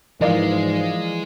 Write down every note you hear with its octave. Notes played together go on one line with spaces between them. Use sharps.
G#2 E3 F3 G#3 A#4 D5 F5